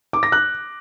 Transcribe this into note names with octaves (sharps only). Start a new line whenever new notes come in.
D6
A#6
F#6